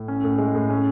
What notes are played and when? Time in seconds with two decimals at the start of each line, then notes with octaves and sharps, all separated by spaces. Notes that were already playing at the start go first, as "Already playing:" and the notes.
Already playing: A2
0.08 C#4
0.24 A2
0.38 G#3
0.55 A2
0.70 C#4